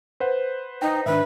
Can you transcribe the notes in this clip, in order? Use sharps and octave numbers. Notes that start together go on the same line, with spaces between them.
B4 C5 F#5
D#4 G5
G#2 D#3 D4 B4 E5